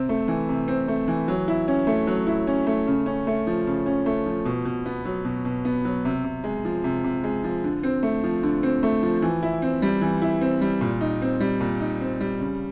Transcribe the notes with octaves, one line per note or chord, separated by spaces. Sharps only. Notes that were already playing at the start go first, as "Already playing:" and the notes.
Already playing: C3 C4
A3
E3
C3
C4
A3
E3
F#3
E4
C#4
A3
F#3
E4
C#4
A3
C#3
C#4
A3
F3
C#3
C#4
A3
F3
B2
B2
B3
F#3
B2
B2
B3
F#3
C3
C3
G#3
F3
C3
C3
G#3
F3
D3
C4
A3
F3
D3
C4
A3
F3
E3
E4
C4
G3
E3
E4
C4
G3
A#2
D#4
C4
G3
A#2
D#4
C4
G3
C#3